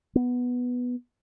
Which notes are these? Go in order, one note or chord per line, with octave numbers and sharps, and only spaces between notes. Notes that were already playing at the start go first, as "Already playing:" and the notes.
B3